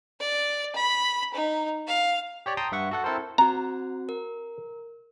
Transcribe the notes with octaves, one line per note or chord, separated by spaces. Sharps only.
D5
B5
D#4
F5
G4 C#5 D5
G5 A5 A#5 C6 D#6
G2 E5 F#5 C#6
F#4 A4 F#5
C4 E4 A4 A#4 C5
C4 F#4 A#5
A#4